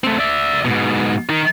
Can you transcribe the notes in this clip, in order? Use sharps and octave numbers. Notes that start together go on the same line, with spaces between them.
A3 C4
D5 E5
G#2 B2
D#3 D#4